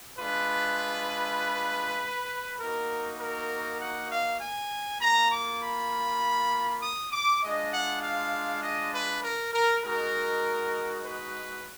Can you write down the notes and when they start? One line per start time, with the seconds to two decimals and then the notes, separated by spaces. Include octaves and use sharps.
0.18 G#3 D4 F4 B4
2.60 A#3 D#4 F#4 A#4
3.20 A#4
3.80 F#5
4.11 F5
4.41 G#5
5.01 A#3 F4 A#5
5.31 D6
5.62 B5
6.83 D#6
7.13 D6
7.42 G#3 D4 F4 D#5
7.73 F#5
8.03 F5
8.63 D#5
8.93 B4
9.24 A#4
9.54 A#4
9.84 G#3 D#4 F#4 A#4
11.05 B4